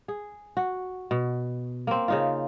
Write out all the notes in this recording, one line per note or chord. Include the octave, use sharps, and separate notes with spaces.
G#4
F#4
B2
A#3 C4
C#3 D#4 F4